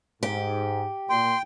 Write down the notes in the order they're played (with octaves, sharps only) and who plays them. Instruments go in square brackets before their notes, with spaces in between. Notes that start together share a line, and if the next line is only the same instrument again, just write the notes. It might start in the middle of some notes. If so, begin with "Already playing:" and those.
[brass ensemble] G#2 [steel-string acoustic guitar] G4
[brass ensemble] A#2 [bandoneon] G5 [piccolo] C6